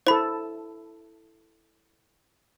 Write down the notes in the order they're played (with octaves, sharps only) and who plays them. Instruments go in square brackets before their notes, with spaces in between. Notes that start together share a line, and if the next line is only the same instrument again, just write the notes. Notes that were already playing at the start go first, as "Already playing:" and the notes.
[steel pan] E4 A4 [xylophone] C5 B5